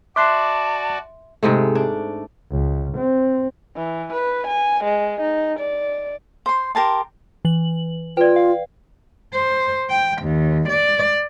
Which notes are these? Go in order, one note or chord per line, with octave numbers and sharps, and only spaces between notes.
F#4 D5 E5 A5 C6 D6 F#6 C7
G#2 C3 G#3 A3
D4
C#2
C4
E3
B4
G#5
G#3
D#4
D5
C5 C6
G4 A#4 A5 C6
E3 F#7
F4 B4 D5 G5
F5
C5
G5
D#2
D5